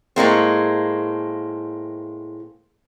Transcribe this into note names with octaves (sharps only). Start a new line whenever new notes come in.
A2 G#3 A#3 C4